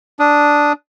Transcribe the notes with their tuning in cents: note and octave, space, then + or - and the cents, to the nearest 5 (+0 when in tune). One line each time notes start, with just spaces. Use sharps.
D4 +0 D#6 +0